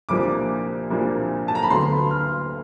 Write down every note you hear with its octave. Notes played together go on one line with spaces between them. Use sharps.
C2 A#2 F3 A#3 D4 D6
C2 A#2 F3 A#3 D4
A5
A#5
B5
D2 D3 F#3 B3 C6
F6